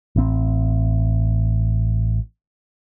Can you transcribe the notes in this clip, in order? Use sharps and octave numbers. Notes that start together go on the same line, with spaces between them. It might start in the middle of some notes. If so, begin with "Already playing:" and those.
A1 C4